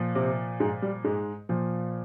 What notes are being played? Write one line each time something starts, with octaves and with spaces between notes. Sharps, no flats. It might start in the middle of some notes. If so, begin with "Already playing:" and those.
Already playing: A#2 F3
C3 C4
G#2 G#3
G3
G#2 G#3
A#2 F3